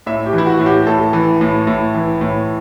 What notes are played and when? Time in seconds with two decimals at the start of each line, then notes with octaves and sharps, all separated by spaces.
0.06 A2 E5
0.26 G4
0.33 E3
0.38 E4
0.46 F#4
0.59 A2
0.66 G4
0.87 A2 A4
1.13 E3
1.41 A2
1.67 A2
1.94 E3
2.21 A2